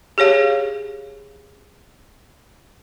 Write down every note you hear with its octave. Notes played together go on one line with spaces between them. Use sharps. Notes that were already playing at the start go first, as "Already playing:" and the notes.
G4 G#4 C#5 F5